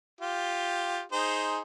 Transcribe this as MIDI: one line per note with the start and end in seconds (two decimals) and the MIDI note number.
0.21 1.02 65
0.21 1.02 67
1.12 1.60 63
1.12 1.60 68
1.12 1.60 72